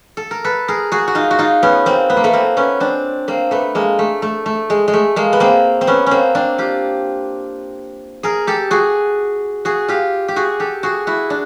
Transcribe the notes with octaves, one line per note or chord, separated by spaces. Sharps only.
A4
A#4
A4 B4
G#4 A#4
F#4 G#4
F#4
D#4 F4
F#4
D#4 F4
B3 C#4
A#3 C4
B3
A#3
A3 B3
A#3 C4
B3 C#4
C4 D4
A#3 C4
A3 B3
G#3 A#3
A3
A3
A3
G#3
G#3
A3
G#3 A#3
B3
A#3 C4
C4
B3 C#4
A#3 C4 C#4
C4 D4
F4 G4
G#4 A#4
G4 A4
F#4 G#4
F#4 G#4
F4 G4
G4
F#4 G#4
G4 A4
F#4 G#4
E4 F#4
D4